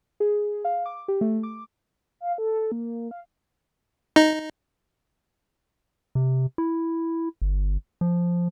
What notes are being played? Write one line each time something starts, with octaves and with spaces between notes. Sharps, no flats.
G#4
F5
D6
G4
A3
D6
F5
A4
A#3
F5
D#4
C3
E4
G1
F3